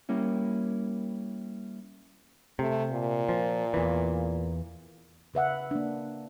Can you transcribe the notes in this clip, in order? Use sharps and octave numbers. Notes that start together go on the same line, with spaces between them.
G3 A#3 C#4 E4
C3 A3
A#2
F3
E2 E3
C#3 B4 E5 F#5
A#3 D4